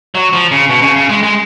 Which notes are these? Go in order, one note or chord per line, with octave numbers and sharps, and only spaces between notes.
F#3
F3
C#3
B2
C#3
C#3
G#3
G#3